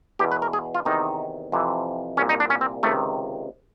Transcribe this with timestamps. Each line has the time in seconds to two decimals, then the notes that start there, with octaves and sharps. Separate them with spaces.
0.19 E2 B2 G4
0.32 B4
0.42 A#4
0.53 G#4
0.75 F4
0.85 E2 C3 D#3 D#4
1.52 F2 C3 E3
2.17 C2 A#2 C#4
2.29 D#4
2.40 D4
2.50 C#4
2.61 C4
2.83 C#2 C3 D#3 A3